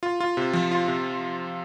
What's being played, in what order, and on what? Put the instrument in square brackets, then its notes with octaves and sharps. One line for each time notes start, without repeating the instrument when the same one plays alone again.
[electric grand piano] F4
F4
C3
F3
F4
C3